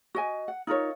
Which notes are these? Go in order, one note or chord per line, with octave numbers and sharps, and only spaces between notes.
F#4 D#5 G#5
F#5
D#4 F4 A#4 C#5